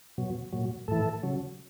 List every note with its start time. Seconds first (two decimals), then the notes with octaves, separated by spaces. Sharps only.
0.18 B2 F#3
0.53 A#2 F#3
0.88 A2 E3 A4
1.23 C#3 F#3